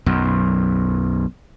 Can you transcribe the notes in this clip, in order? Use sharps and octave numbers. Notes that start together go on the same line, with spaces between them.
B1 F#2